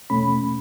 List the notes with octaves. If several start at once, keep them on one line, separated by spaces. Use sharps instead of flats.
E2 B2 A3 C#4 B5